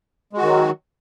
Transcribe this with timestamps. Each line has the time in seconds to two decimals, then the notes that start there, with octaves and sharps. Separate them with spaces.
0.33 G#3
0.38 F#4
0.42 D#3
0.47 F#3